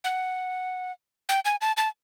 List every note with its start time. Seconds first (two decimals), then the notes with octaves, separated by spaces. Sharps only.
0.04 F#5
1.29 G5
1.45 G#5
1.61 A5
1.77 A5